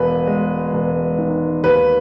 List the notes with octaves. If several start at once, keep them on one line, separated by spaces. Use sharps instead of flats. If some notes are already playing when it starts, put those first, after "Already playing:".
Already playing: E1 B4
G#3
E1
D#3
D#2 B4